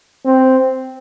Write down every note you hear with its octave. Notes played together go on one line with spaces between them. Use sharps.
C4